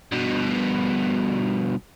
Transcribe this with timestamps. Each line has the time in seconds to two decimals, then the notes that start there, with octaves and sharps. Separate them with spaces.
0.12 G2 B2